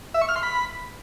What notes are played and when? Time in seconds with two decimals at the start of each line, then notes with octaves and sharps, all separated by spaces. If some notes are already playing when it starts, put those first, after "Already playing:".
0.14 E5
0.22 C#6
0.29 F6
0.36 C6
0.43 B5